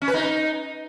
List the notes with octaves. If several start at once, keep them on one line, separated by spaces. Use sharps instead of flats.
C#4
B4
D#4